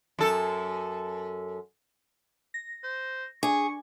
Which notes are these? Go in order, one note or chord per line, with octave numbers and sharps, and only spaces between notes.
F#2 A4
A#6
C5
D4 G#4 G#5 C#6